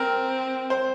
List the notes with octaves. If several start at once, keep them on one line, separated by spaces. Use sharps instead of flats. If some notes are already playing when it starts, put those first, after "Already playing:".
Already playing: C4 A#4
C5